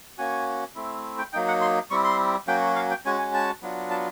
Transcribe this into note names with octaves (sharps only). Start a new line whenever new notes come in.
A#3 C#4 F#4 G#5
A3 C4 E4
G5
F#3 A#3 D#4 G5
F#5
C6
G3 C4 E4 C#6
C6
F#3 A#3 C#4 F#4 G5
F5
G5
G#3 C#4 F#4 G#5
G#5
A5
F#3 B3 D4 F4
A5